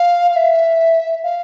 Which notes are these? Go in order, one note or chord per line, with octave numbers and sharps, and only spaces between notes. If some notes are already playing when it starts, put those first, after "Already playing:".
Already playing: F5
F5
E5
F5